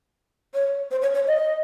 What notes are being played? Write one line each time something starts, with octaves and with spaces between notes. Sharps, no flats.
C#5
C5
C#5
C#5
D#5